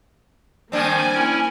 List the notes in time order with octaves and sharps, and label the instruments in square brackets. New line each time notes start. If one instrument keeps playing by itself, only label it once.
[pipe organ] D#3 F3 G3 [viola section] A#3 G#5 [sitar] C4 D4
[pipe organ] C#4 E4 A#4